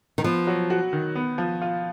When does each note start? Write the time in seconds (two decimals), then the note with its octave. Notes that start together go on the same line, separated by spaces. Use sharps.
0.18 D#3
0.24 F3 B3
0.47 F#3
0.70 F#4
0.93 D#3
1.15 B3
1.38 F3
1.62 F4